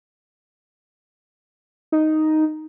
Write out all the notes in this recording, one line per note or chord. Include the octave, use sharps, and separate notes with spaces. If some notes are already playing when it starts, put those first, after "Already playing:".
D#4